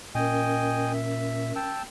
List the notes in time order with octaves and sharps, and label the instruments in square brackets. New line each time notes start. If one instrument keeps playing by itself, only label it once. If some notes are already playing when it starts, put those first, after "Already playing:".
[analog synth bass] A#2 [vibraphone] C#4 A#4 [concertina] D#5 G5 G#5
[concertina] E5
G5 A5 E6